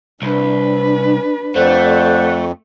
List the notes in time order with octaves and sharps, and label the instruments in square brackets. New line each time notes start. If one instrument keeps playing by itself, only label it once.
[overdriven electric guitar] C2 [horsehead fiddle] D4 B4
[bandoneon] F2 [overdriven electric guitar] A3 [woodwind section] C5 D5 F#5